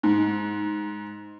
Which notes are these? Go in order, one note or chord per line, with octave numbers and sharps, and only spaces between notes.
G#2